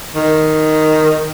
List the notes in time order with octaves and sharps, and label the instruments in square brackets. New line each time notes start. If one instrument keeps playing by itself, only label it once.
[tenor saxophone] D#3